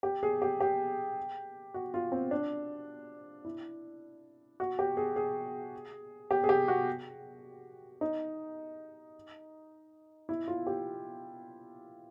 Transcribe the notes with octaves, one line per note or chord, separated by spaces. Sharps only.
G4
G#4
G4
G4
F#4
F4
C4
D4
E4
F#4
G4
G#4
G#4
G4
G#4
G4
F#4
D#4
E4
F4
G4